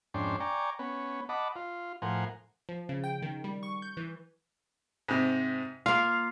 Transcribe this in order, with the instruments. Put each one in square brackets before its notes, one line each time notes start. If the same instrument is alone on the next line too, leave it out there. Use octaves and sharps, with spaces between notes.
[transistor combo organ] F2 G#2 C#4 D4 G5 C6
D5 G5 G#5 A#5 C#6
B3 C#4
D#5 F#5 A5 B5 D6
F4
A2 F3 A#4 C5 F#5 G#5
[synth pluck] F3
C#3
G5
D#3
G3
C#6
G6
E3
[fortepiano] G#2 C3
[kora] A#3 F4 [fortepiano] F5